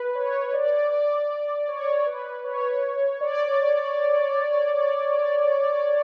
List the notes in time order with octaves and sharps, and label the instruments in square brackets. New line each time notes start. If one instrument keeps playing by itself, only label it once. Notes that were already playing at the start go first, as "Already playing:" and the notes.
Already playing: [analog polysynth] B4
C#5
D5
D5
C#5
B4
C#5
D5